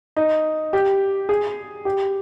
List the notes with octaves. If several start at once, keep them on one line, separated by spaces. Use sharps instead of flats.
D#4
G4
G#4
G4